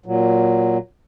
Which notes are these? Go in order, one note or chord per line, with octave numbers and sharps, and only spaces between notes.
A#2 F#3